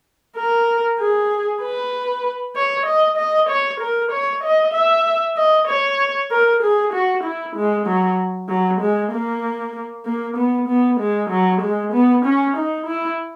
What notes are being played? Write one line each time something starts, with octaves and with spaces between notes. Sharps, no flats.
A#4
G#4
B4
C#5
D#5
D#5
C#5
A#4
C#5
D#5
E5
D#5
C#5
A#4
G#4
F#4
E4
G#3
F#3
F#3
G#3
A#3
A#3
B3
B3
G#3
F#3
G#3
B3
C#4
D#4
E4